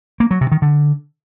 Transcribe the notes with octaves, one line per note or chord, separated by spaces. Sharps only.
A#3
F#3
C3
D#3
D3